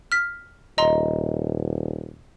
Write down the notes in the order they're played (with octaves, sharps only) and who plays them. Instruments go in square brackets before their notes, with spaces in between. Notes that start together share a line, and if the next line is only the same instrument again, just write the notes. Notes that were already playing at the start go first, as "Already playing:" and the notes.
[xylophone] F6 B6
[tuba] D#1 [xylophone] D#5 A#5 C6